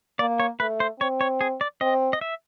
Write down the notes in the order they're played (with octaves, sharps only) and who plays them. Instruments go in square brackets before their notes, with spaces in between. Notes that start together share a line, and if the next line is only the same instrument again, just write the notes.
[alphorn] A#3 [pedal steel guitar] D5
[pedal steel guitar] C#5
[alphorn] A3 [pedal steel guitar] B4
[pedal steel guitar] C5
[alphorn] C4 [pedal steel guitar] C#5
[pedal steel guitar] C#5
G#4
D5
[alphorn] C4 [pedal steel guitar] D#5
[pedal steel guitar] D#5
E5